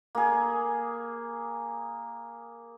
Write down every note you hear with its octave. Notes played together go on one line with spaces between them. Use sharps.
A#3 G#4